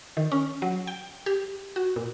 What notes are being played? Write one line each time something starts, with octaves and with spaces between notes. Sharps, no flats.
D#3
C#4
F#3
G5
G4
F#4
A#2